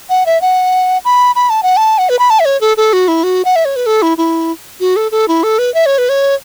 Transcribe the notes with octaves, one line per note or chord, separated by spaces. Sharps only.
F#5
E5
F#5
B5
B5
A5
F#5
A5
F#5
B4
B5
A5
E5
C#5
A4
A4
F#4
E4
F#4
F#5
E5
C#5
B4
A4
E4
E4
F#4
A4
A4
E4
A4
B4
E5
C#5
B4
C#5